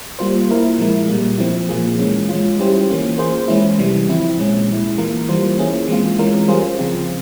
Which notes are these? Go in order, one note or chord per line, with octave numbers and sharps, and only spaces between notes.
G3 A#3 F4 C5
A#3 E4 A#4
A#2 F3 G#3 E4
A#2 G3 A#3
F3 C4 E4
A#2 F3 A#3 F4 G#4
E3 G#3 C#4
G#3 C#4 F4
G3 C#4 E4 G4 C5
E3 A#3 C#4 F4
A#3 F4 G#4 C5
E3 G#3 C#4 E4
C3 E3 G3
C#3 F3 C4 E4
A#2 G#3 C#4
A#2 G#3 E4
E3 A#3 F4 A#4
E3 G3 A#3 F4 C5
A#3 C#4 E4 G#4
E3 G#3 C4 F4
E3 G#3 C#4 F4 A#4
G3 C#4 F4 G#4 C5
C#3 F3 C4 F4